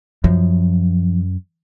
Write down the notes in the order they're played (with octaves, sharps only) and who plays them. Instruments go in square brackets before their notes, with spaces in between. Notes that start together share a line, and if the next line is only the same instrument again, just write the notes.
[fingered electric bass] F#2 [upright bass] F3